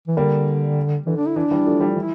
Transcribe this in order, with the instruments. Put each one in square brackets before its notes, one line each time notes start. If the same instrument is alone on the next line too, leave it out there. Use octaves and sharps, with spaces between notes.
[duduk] E3
[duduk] D3 [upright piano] G3 A#3
[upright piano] D3 [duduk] E3
[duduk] D4
E4
[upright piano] E3 [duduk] D4
[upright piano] E3 G3
F3 A3
E3 G3
[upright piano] E3 [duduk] E4